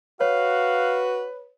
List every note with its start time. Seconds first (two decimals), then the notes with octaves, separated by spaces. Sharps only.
0.21 F#4 B4 C#5 F5